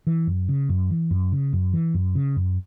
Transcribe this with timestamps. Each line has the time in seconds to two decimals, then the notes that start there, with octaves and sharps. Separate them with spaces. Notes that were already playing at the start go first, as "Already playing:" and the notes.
0.07 E3
0.27 F#2
0.49 C#3
0.69 F#2
0.91 E3
1.11 F#2
1.32 C#3
1.53 F#2
1.73 E3
1.94 F#2
2.15 C#3
2.36 F#2